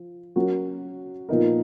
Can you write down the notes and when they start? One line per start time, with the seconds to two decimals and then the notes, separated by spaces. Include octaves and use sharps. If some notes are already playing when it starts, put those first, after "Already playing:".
Already playing: F3
0.36 F#3 C#4 F#4 A#4
1.29 A#2 F3 B3 D#4 A#4